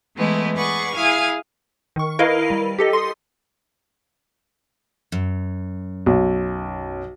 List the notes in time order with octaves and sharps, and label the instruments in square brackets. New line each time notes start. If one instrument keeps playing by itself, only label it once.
[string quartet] E3 G#3 A3 B3 E4
G#4 B4 D5 F#5 C#6
E4 G#4 F5 G#5
[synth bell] D#3 C#6
E4 A#4 B4 D#5 F5
G3
G4 A4 D#5
C6 D#6
[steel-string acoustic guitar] F#2
[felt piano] B1